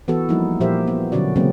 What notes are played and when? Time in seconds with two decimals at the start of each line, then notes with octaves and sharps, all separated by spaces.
0.08 E3 B3 F#4 A4
0.29 F3 G3 A#3 D#4 E4
0.60 A#2 F3 G4 A#4 C5 E5
0.88 B3
1.12 B2 D3 F#3 C#4 F#4 D5
1.36 C#3 F#3 G#3 A#3 C4 C#4